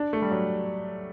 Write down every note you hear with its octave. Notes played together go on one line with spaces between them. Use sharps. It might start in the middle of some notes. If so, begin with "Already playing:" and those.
Already playing: D4
A3
G3
F#3